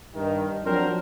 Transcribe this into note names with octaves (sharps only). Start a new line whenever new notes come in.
G2 D#3
F3 F#3 C4 D4 A#4 C5